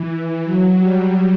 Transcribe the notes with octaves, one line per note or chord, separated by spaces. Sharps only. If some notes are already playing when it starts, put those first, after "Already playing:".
Already playing: E3
F#3
G3